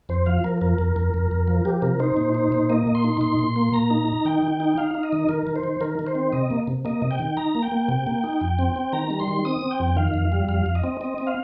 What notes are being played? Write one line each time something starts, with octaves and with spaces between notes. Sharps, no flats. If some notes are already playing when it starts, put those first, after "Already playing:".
F2 C5
F3 F5
F3 A#4
F2 A#4
F2
F2
F2
F2
F3
F3 G4
C3 A#4
D#4 C5
A#2
D#4
A#2
A#3 D#5
A#2
C6
D#4
A#2 C6
A#2
A#3
A#2 A#5
D#4
D#4
D#3 G5
D#3
D#4
D#4 F5
D#4
D#5
D#3
D#3 A#4
D#3
C5
D#3
D#3 A#4
D#3
C5
C4
C3 D#5
A#3
C3
A#3 D#5
C3
G5
D#3
D#4 A#5
A#3
G5
A#3
C3
A#3
D#4
F2
C4
C4
D#3 A#5
G3
C6
D#3
C4 D#6
C4
G5
F2
D#3 F5
F2
G3
F2 F5
F2
D#5
C4
C4 D#5
C4
F5